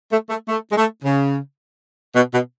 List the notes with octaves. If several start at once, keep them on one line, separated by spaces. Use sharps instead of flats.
A3
A3
A3
G#3
A3
C#3
B2
B2